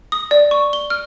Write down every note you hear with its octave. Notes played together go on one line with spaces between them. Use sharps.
D#6
D5
C#6
G7
F6